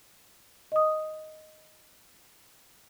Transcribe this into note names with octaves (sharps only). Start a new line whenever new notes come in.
D#5 D#6